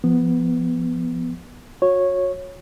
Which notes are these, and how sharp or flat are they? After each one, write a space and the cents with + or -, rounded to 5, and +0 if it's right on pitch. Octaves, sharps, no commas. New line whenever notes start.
F3 -20 B3 +0
F#4 -30 C#5 -10